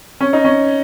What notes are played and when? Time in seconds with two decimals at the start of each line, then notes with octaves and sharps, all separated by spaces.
0.20 C#4
0.33 D#4
0.44 C#4